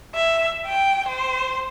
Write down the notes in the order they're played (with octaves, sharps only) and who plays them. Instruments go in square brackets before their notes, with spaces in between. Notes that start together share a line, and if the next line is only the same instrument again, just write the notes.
[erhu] E5
G5
C5